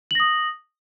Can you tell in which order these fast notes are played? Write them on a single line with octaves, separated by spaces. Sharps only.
F#7 A#6 D#6